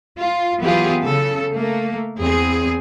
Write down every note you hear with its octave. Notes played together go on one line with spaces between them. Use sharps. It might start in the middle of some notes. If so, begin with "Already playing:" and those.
F4
E3 F#3 B3 F4 G4 G#4
C#3 A4
A3 A#3
E2 C4 G#4